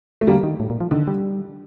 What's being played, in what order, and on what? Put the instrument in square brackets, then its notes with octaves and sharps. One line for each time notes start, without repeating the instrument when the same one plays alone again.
[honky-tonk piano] A3
[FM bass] D3 [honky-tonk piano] G3 A#3
[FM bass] D#3
A2
A#2
F3
[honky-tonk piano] D3 [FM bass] D#3
[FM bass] G3